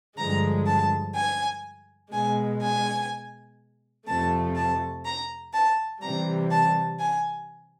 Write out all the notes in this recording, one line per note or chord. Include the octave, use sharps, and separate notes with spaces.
G2 D3 F3 G#3 A#5
A5
G#5
B2 G#3 G#5
G#5
F2 C3 F3 A3 A5
A5
A#5
A5
C3 E3 G3 A#5
A5
G#5